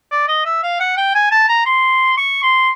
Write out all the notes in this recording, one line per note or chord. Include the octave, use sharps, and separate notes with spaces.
D5
D#5
E5
F5
F#5
G5
G#5
A5
A#5
C6
C#6
C6